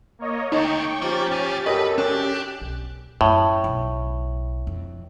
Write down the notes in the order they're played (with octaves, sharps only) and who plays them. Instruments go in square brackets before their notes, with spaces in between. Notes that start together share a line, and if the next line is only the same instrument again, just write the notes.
[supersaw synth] A#3 C#5 D#5
[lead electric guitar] D2 [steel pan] D#4 [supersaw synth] G5 C#6
[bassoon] F3 [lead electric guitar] A#3 [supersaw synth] C#4 G4 A6
[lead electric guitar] A2 G#5
[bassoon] F#2 [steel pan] G4 D#5 [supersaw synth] A4 [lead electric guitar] B4
[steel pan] C#4 [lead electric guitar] D4 [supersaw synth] G4
[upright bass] B1
[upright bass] F#2 [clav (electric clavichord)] A2
[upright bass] B1
F2